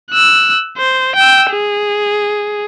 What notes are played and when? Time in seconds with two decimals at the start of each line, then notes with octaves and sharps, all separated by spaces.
0.11 E6 F#6
0.78 C5
1.16 G5 E6
1.51 G#4